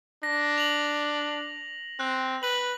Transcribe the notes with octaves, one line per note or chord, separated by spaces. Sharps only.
D4 A#6
F7 F#7
C4 F#6
B4 F#7